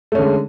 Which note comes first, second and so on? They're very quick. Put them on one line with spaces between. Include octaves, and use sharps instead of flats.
A3 C#4 D3 G#3